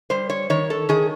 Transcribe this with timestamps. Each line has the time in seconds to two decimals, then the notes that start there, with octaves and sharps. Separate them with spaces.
0.10 G3 C5
0.30 C#5
0.50 D#3 C#5
0.70 A4
0.89 D#3 G#4